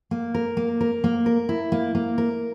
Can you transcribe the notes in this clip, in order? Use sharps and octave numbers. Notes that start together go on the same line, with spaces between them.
A#3
A#4
A#3
A#4
A#3
A#4
E4
A#3
A#3
A#4